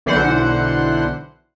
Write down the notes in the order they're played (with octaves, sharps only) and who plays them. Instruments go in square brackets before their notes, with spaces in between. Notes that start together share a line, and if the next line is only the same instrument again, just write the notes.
[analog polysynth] B1 D3 E3 C5 F#5